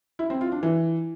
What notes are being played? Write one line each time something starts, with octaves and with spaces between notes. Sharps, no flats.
E4
C4
F4
D4
E3